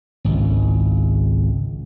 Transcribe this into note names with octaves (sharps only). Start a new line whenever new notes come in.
G#1 C#2